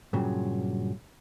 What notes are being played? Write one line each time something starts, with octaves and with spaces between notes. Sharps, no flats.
G2 A#2 C#3 F#3